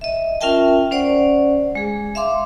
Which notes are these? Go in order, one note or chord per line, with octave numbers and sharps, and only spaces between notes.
D#5 E5
C#4 F4 A#4 E5 G5 A5
C#4 C5 D5 F#5
G#3 G#4
E5 F5 C6 D6